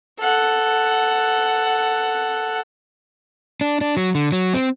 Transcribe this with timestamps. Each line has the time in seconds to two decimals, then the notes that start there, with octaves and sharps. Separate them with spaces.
0.19 A4 F#5
3.61 D4
3.81 D4
3.97 F#3
4.15 D3
4.32 F#3
4.54 C4